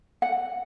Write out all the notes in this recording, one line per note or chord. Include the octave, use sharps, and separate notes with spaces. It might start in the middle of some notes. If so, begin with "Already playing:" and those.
F#5